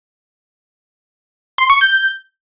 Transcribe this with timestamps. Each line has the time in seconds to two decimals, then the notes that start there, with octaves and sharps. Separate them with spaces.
1.58 C6
1.70 C#6
1.81 G6